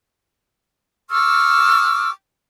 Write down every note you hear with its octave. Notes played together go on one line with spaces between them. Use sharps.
C#6 D6 E6 F6